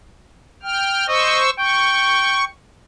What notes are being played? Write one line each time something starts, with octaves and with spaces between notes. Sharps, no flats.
G5 F6
C5 D#5 C#6 E6
G5 C#6